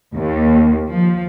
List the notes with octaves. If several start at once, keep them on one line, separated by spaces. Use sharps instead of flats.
D#2
F3